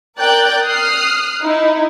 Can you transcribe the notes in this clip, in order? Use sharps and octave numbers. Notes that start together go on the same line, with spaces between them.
A#4 D5 G5 F#6 G6 A6
D#6 F6 F#6 C7
D#4 E4